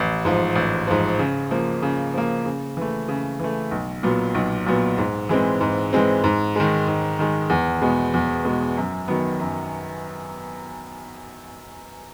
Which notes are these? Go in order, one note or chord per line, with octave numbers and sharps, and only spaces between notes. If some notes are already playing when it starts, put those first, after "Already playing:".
Already playing: A1
G#2 F3
A1
G#2 F3
C#3
F3 A#3
C#3
F3 A#3
C#3
E3 A3
C#3
E3 A3
B1
A#2 F#3 B3
B1
A#2 F#3 B3
G#2
E3 G#3 C4
G#2
E3 G#3 C4
G#2
D#3 G#3
G#2
D#3 G#3
E2
B2 G#3 B3
E2
B2 G#3 B3
F#2
D#3 F#3 B3
F#2